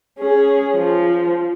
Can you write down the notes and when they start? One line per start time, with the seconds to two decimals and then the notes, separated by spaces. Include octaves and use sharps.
0.19 C#4 G#4
0.75 F3